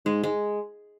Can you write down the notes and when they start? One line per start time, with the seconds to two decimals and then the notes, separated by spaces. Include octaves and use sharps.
0.06 G#2 G#3
0.23 G#3